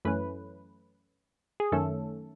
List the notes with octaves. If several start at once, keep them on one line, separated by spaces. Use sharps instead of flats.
F#2 E3 A3 C#4 B4
G#4
F#2 D#3 A3 C#4 A4